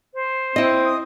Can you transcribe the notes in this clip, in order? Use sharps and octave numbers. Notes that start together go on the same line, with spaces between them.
C5
C4 E4 D#5
D#6